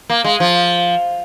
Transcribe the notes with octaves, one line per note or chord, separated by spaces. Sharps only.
A#3
G#3
F3